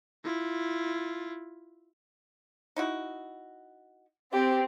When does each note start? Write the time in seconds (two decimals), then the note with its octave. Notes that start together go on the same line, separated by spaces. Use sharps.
0.24 E4 F4
2.76 D#4 E4 F#4
4.33 C4 G4